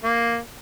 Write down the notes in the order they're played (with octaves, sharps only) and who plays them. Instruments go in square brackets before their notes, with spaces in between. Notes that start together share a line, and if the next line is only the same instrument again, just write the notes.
[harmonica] A#3